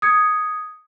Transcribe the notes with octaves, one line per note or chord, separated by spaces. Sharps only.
D#6 G#6 C#7